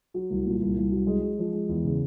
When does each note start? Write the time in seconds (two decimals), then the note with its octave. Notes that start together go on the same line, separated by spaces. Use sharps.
0.14 F#3
0.30 C2
0.46 A#2
0.61 C2
0.77 C2
0.92 F#3
1.07 G#3
1.22 G#3
1.39 F3
1.53 G#3
1.69 E2
1.84 C#3